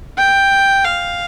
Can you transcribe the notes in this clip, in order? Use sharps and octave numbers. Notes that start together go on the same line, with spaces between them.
G5
F5